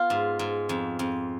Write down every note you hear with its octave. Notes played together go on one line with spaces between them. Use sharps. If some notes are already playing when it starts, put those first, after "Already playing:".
Already playing: B3 F4
G#2
G#2
F2
F2